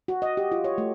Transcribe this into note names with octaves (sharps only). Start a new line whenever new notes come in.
F#4
D#5
G4
F4
C#5
A3